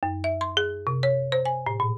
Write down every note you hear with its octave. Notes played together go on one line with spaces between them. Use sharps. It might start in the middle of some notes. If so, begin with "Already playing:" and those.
F#2
E5
C6
G#4
C3
C#5
C5
G#5
A2
A#2